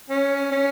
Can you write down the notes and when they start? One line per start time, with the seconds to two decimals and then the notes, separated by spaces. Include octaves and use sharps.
0.10 C#4
0.52 C#4